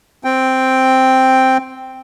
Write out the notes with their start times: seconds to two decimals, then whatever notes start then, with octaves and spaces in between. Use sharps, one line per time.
0.24 C4 G5